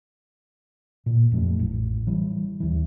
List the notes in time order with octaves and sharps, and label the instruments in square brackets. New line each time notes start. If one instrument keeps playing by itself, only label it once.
[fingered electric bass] A#2
F2 F#3 G3 A3
A1
E3 G3
D#2 E3